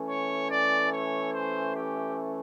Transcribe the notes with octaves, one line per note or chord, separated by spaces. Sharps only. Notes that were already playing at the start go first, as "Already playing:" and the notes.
Already playing: E3 A3 C#4
C#5
D5
C#5
C5
G4